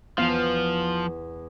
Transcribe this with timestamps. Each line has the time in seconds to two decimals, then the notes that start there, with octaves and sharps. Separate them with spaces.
0.18 E2 F3 B3 F5